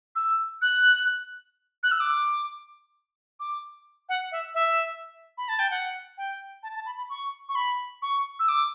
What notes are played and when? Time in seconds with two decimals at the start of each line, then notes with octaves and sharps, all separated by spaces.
0.16 E6
0.62 F#6
1.83 F#6
1.91 E6
2.00 D6
3.40 D6
4.09 F#5
4.32 E5
4.55 E5
5.38 B5
5.49 A5
5.59 G5
5.71 F#5
6.18 G5
6.63 A5
6.75 A5
6.86 B5
6.98 B5
7.10 C#6
7.49 C#6
7.55 B5
8.02 C#6
8.39 E6
8.49 D6